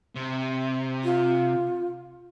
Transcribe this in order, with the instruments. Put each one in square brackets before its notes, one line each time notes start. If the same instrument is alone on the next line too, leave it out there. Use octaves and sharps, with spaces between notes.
[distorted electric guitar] C3
[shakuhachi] F4